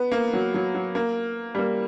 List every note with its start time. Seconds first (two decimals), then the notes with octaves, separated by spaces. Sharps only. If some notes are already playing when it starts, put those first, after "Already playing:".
Already playing: B3
0.12 A#3
0.33 F#3
0.54 F#3
0.74 F#3
0.95 A#3
1.55 G3
1.59 A#3